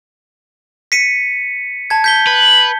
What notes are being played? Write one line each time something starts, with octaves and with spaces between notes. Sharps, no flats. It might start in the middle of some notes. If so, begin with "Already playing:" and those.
B6 C#7 D#7
A5 G#6
G6 B6 G7
B4